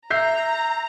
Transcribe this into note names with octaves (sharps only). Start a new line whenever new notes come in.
E5 A#5 G6 C7